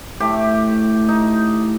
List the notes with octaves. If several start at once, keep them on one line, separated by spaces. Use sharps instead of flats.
A2 A3 G4
D#4